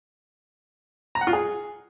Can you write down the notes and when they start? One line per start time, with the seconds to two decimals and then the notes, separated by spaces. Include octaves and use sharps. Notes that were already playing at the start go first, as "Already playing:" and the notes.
1.15 A#5
1.21 F#5
1.27 F4
1.33 G#4